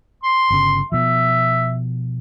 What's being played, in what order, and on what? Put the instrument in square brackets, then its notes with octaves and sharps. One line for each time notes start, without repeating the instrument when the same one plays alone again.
[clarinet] C6
[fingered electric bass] G1 C#3
[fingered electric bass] B2 F3 [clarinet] E5